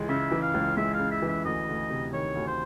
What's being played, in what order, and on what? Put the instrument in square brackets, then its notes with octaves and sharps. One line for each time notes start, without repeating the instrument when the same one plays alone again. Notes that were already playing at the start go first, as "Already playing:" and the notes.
Already playing: [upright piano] C#2 E3 G#3
[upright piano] C#3 [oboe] E5
[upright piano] E3
[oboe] F5
[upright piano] C#2
[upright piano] G#3 [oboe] E5
[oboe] F5
[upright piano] C#3
[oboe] E5
[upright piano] E3
[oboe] E5
[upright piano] D2 [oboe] D#5
[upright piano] D2
C3
[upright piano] D#3 [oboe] C#5
[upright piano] D2
[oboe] C5